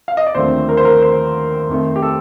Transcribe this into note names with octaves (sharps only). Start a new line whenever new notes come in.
F5
D#5
D5
D#2 D3 F3 A3 C4 C5
A#4
C5
A#4
C5
F2 D#3 A3
G4
A4